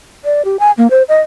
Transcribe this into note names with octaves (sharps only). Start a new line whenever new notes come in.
D5
G4
G#5
A#3
C5
D#5